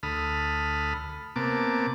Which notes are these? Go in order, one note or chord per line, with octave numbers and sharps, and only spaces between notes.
D2 A4 B5 D#6 F6
C3 A#3 B3 A5 D6